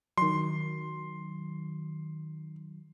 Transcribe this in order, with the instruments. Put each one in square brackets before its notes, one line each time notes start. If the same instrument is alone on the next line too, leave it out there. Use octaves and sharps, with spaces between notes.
[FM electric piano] D#3 F#3 [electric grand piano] C6